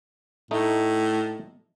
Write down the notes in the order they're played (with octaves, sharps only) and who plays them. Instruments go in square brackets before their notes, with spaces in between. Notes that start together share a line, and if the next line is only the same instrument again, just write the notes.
[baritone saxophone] A2 [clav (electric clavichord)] A3 D#4